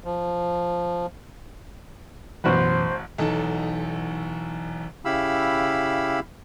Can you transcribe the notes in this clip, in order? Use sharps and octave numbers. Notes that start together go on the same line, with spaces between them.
F3
A1 F#2 B2 E3 F#4 B4 C5
B1 E2 D#4 A4 A5
C#3 E4 G4 F5 B5 E6